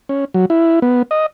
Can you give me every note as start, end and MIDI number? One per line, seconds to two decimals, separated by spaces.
0.09 0.25 61
0.34 0.45 54
0.50 0.80 64
0.82 1.02 59
1.11 1.26 75